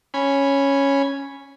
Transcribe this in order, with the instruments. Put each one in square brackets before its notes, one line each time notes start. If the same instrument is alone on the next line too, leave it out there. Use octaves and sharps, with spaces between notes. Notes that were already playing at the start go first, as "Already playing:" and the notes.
[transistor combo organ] C#4 G#5 B5